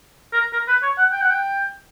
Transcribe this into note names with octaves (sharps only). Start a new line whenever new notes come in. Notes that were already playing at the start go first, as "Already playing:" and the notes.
A#4
A#4
B4
C#5
F#5
G5
F#5
G5